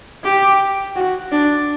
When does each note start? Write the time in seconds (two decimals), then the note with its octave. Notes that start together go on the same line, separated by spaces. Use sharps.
0.24 G4
0.96 F#4
1.32 D4